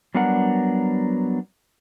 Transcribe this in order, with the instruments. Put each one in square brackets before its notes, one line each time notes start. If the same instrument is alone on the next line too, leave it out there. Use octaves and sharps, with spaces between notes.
[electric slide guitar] F#3 G3 B3 D4 A#4 F#5